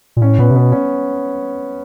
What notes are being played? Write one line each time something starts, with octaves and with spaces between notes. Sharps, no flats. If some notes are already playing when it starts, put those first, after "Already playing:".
A#2
A2 C#4
A#2 B3
C3
B2 B3
C#4